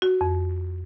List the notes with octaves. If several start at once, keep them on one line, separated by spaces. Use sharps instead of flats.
F#4
F2